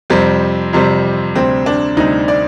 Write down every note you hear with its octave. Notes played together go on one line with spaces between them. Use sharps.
F2 C3 G3 C4
F2 C3 G3
D2 C3 G3 C4
D4
D2 C3 G3 D#4
D5